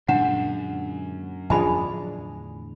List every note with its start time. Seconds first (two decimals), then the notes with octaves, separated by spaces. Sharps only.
0.08 F#2 A#2 D3 G#3 D4 F#5
1.50 E2 A2 D3 F3 D4 G#4 G#5 B5